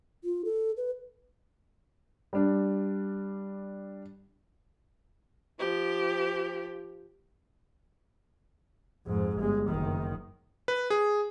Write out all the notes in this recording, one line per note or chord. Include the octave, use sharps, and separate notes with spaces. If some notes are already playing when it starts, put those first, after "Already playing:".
F4
A4
B4
G3 D4
F3 G4
F2 G#2
G1 G#3
F#1 D#3
B4
G#4